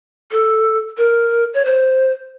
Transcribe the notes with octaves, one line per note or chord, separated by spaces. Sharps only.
A4
A#4
C#5
C5